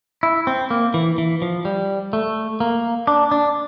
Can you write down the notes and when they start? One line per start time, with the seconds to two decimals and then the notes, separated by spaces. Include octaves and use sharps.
0.23 E4
0.47 C4
0.71 A#3
0.94 E3
1.18 E3
1.42 F3
1.65 G3
2.13 A3
2.60 A#3
3.07 D4
3.31 D4